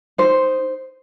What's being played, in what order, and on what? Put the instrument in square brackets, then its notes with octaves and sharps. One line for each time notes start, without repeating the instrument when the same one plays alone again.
[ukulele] D#4 C5